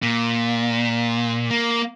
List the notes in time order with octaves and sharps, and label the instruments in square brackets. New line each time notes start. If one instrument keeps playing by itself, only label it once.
[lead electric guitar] A#2
A#3